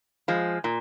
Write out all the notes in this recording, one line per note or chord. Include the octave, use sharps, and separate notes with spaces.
F3 G#3
A#2